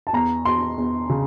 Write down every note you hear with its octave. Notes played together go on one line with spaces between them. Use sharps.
A5
E2 A#5
E2 C6
E2
C#3